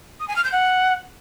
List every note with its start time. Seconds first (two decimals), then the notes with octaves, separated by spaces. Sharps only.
0.20 D#6
0.28 G#5
0.36 F6
0.44 G6
0.52 F#5